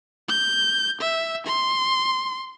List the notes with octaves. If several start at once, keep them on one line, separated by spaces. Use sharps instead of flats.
G6
E5
C6